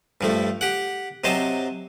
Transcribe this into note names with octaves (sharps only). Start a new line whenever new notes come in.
G2 F3 A3
G4 F#5
C3 F#3 C5 D#5 A5